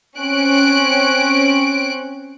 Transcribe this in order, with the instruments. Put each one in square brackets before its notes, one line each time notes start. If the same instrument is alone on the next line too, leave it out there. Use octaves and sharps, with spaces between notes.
[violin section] C4 C#4 F#6 D7